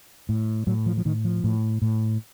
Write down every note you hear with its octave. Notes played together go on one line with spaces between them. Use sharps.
A2
A2 F#3
F3
F3
A2 D#3
F3
A2
A2